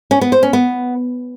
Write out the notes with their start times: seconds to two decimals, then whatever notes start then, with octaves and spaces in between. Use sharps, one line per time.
0.11 C#4
0.21 B3
0.32 C5
0.43 C#4
0.53 B3